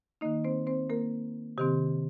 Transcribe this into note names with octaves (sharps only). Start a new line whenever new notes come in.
D#3 A#3 D#4 D#5
C4 C5
C4 C5
A#3 A#4
C3 D#3 C4 G4